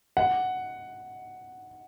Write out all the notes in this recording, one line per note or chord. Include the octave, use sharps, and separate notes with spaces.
F#5